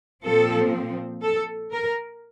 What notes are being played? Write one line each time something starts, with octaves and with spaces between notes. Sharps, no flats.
A#2 F3 C4 A4
A4
A#4